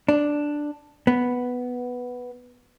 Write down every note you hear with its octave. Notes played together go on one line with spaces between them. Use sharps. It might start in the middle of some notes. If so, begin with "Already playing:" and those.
D4
B3